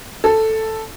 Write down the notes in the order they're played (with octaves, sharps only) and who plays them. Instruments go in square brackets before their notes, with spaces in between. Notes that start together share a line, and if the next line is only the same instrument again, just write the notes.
[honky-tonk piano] A4